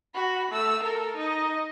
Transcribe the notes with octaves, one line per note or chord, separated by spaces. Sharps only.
F#4 B5
A3 E6
A4 A#4
D#4 D#5